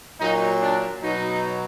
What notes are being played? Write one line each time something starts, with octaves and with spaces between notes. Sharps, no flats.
A#2 F#3 D#4
D4
B2 F#3 D#4